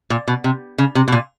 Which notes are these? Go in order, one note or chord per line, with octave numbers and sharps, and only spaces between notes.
A#2
B2
C3
C#3
C3
B2
A#2